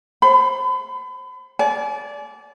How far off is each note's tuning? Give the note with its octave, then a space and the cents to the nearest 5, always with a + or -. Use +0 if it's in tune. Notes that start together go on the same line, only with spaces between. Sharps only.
C5 +30 B5 +35
D5 -20 G#5 +40